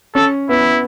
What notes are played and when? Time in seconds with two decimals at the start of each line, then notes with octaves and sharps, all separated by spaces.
0.15 C#4 A4
0.49 B3 E4